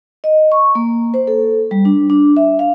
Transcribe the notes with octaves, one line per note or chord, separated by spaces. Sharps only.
D#5
C#6
A#3
C5
A4
G3
D4
D4
E5
F5